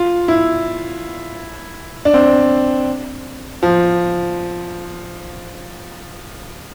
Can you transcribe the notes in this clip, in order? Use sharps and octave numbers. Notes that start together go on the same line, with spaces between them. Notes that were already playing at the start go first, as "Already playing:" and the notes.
Already playing: F4
E4
D4
C4
F3